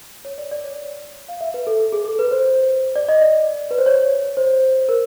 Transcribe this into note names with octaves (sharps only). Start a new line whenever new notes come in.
C#5
D5
D5
C#5
F5
E5
B4
A4
A4
G#4
A4
B4
C5
D5
D#5
D5
B4
C5
C#5
C5
A#4